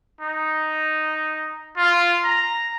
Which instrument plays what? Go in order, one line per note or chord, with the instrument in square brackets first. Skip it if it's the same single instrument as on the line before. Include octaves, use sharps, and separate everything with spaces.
[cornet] D#4
F4
A#5